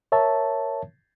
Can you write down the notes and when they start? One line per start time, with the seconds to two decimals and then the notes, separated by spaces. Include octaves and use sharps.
0.12 A#4 C#5 E5 A5